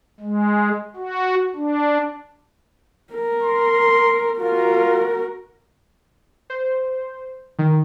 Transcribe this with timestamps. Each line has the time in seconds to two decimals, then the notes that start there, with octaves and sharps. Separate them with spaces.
0.20 G#3
0.96 F#4
1.56 D4
3.13 A#4
3.43 C6
4.39 F4 F#4 A#4
6.50 C5
7.59 D#3